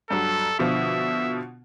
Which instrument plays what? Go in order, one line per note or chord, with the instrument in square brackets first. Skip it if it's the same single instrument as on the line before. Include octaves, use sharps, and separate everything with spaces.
[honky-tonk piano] G2 F#3 [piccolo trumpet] A4
[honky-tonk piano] B2 D3 F3 [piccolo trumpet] E5